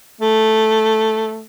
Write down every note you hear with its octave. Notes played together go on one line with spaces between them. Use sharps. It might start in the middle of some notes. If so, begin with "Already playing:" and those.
A3